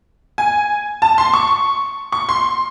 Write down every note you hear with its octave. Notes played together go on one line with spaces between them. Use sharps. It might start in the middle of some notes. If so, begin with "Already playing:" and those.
G#5
A5
C6
C#6
C#6
C6